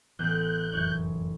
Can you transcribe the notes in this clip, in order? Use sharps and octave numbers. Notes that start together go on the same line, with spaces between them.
A1 E3 B3 F#6 G6
F1 F#2 E3 C#5